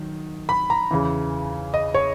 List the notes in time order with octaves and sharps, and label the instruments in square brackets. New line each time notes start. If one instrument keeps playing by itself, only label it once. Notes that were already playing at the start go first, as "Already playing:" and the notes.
Already playing: [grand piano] D#3 F#3
B5
A#5
E2 C#3 E3
D#5
C#5